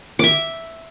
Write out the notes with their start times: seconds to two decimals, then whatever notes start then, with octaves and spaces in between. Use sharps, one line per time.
0.19 E5 D6